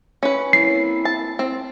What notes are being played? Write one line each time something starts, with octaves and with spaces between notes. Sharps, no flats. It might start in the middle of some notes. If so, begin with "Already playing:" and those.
C#4 B4
A#3 C4 E4 C7
A5
C4